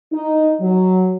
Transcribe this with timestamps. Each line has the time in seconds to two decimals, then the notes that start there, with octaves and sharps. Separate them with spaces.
0.12 D#4
0.61 F#3